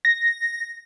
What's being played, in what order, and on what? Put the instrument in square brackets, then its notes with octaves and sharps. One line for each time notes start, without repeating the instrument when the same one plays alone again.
[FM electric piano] A#6